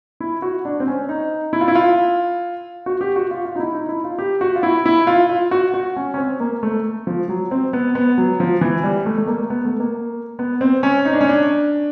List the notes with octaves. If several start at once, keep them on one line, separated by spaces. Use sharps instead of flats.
E4
F#4
D4
C4
C#4
D#4
E4
F4
E4
F4
F#4
G4
F#4
F4
F4
D#4
E4
D#4
E4
F4
G4
F#4
F4
E4
E4
F4
F4
F#4
F#4
C#4
C#4
C4
A#3
A3
F3
F#3
C4
B3
B3
F#3
F3
E3
G3
A3
A3
A#3
B3
A3
A#3
B3
C4
C#4
D#4
D4
C#4
D4